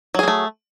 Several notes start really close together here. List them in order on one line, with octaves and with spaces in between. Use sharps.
F#3 G#4 A#3 A3